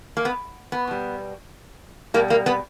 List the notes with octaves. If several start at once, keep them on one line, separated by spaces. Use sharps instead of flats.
A#3
B3
B3
B2 G3
B2 G3 A#3
A#3
B3